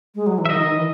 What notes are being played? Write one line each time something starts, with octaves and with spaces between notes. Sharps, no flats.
G#3
F#3
E3
E5
D#3 D#5
D#3
E3